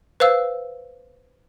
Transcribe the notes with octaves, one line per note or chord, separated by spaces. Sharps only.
B4 C5 F5 E6